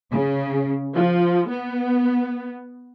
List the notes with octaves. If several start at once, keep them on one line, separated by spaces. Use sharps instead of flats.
C#3
F3
B3